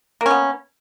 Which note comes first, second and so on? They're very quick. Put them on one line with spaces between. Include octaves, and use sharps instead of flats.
A#3 C#4 B3